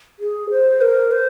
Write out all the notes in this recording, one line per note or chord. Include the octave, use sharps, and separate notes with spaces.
G#4
C5
A#4
C5